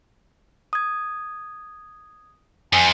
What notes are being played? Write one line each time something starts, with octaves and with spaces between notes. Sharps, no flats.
D#6 G#6
F2 G#5